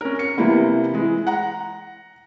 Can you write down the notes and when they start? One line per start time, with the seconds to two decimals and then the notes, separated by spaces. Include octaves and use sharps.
0.01 C#4 A#4
0.19 C#7
0.37 C3 E3 G3 A#3 B3
0.94 E3 G#3
1.27 F#5 A#5